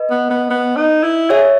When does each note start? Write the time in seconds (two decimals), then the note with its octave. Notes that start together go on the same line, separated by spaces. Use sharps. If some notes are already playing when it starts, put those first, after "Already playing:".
Already playing: B4 D#5
0.10 B3
0.30 B3
0.50 B3
0.77 D#4
1.03 E4
1.30 G#4 C#5 E5